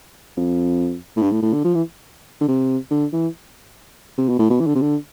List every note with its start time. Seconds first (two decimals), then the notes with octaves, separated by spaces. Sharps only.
0.37 F2
1.16 A2
1.22 G2
1.31 A2
1.42 A2
1.53 D3
1.64 F3
1.75 E3
2.41 D3
2.48 C3
2.91 D3
3.13 E3
4.18 C3
4.29 B2
4.39 A2
4.50 B2
4.60 E3
4.67 D3
4.75 C3
4.81 D3